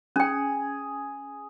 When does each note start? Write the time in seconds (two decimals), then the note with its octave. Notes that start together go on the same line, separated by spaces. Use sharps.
0.16 C#4 G#4 G5